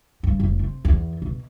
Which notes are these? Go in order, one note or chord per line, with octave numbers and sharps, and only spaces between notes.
G2
F1
C3
E2
B2